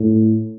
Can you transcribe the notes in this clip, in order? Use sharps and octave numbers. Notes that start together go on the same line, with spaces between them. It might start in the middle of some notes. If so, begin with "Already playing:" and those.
Already playing: A2